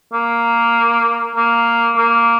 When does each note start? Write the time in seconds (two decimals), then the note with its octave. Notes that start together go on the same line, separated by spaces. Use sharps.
0.13 A#3
1.36 A#3
1.97 A#3